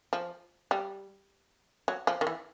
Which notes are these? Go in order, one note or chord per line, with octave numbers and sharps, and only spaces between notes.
F3
G3
F#3
F3
D#3
E3